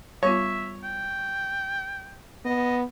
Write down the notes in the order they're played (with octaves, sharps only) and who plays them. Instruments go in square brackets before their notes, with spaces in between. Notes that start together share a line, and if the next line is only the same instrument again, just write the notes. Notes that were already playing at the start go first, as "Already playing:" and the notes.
[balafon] G3 B3 F4 [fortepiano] C#5 [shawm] E5
[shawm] G5
[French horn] B3 [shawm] D#5